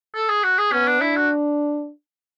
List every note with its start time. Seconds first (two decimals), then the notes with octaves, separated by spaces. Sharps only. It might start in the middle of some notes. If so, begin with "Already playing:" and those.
0.14 A4
0.29 G#4
0.43 F#4
0.58 G#4
0.72 B3 C#4
0.87 D4
1.01 D4 E4
1.16 F#4